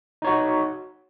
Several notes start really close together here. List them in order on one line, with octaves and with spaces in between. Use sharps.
D#4 C#5 F#4